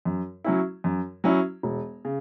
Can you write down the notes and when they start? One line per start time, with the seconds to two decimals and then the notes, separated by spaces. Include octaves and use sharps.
0.05 F#2
0.44 F#3 C#4 E4
0.84 F#2
1.24 F#3 C#4 E4
1.63 E1
2.05 C#3